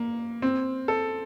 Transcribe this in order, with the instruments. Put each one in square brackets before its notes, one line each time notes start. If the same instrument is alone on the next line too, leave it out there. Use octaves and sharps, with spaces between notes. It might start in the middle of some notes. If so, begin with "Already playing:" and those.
Already playing: [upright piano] A#3
C4
A4